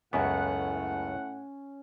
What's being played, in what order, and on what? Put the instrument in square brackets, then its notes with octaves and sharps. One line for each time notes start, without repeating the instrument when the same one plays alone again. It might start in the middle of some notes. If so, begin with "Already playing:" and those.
[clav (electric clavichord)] C#2 F#2 B3 [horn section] A2 F#5 [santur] C#4